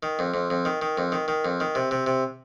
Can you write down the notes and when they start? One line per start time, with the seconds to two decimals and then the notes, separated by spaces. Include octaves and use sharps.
0.03 D#3
0.19 F2
0.34 F2
0.50 F2
0.65 D#3
0.82 D#3
0.98 F2
1.12 D#3
1.28 D#3
1.45 F2
1.60 D#3
1.75 C3
1.91 C3
2.06 C3